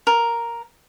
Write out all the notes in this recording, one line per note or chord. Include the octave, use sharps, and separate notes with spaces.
A#4